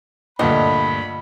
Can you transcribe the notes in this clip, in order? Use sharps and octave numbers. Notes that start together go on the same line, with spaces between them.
D2 G2 A#2 G3 B3 D#5 B5